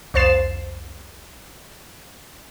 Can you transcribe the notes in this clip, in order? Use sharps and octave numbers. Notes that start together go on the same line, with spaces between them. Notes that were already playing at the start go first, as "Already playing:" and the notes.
C2 F2 C5 A6 C7 E7